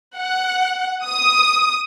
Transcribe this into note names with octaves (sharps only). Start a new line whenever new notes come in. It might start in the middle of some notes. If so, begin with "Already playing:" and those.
F#5
D#6